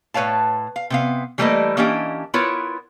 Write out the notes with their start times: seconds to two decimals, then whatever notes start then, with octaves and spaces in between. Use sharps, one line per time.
0.14 A2 B4 C#5 F5 A5
0.76 F5
0.90 C3 B3 F5
1.38 E3 G3 A3 A#3 B4 D#5
1.77 E3 A#3 C#4 D4 G4 D#5
2.34 B3 E4 F4 A#4 B4 C#5